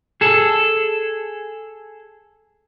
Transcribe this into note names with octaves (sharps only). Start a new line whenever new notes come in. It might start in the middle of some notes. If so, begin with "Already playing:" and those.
G#4 A4